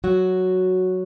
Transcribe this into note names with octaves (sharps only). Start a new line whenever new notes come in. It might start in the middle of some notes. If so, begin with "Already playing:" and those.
F#3 F#4